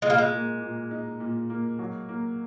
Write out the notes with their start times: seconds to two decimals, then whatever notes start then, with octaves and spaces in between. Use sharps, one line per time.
0.02 A#2 G#3
0.10 A#3
0.18 G#3
0.32 A#3
0.61 A#2
0.91 D#4
1.20 A#2
1.50 A#3
1.79 F#3
2.09 A#3